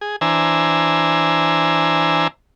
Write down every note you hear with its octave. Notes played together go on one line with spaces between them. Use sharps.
G#4
E3 D4 C5 G#5 A#5 E6